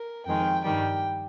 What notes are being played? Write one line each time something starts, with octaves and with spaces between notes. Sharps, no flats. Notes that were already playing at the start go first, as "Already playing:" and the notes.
Already playing: A#4
F2 D#3 G#3 G5
G2 D#3 G3 G5